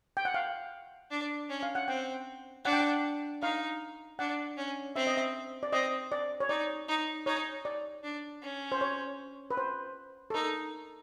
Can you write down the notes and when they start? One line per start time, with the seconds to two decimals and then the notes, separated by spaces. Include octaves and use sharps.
0.17 G5
0.25 F#5
0.34 F5
1.11 D4
1.50 C#4
1.63 F5
1.75 F#5
1.88 C4 G5
2.65 D4 F#5
2.73 G5
2.81 F#5
3.42 D#4 F5
4.19 D4 F#5
4.57 C#4
4.96 C4 E5
5.07 D#5
5.17 E5
5.63 D5
5.72 C4 D#5
6.12 D5
6.40 C#5
6.49 D#4 D5
6.88 D#4
7.26 D#4 C#5
7.65 D5
8.04 D4
8.42 C#4
8.72 C5
8.81 C#5
9.51 B4
9.57 C5
10.30 A4
10.34 D#4 A#4